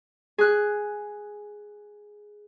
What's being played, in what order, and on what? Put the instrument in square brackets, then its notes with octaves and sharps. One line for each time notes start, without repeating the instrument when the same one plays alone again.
[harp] G#4 F#6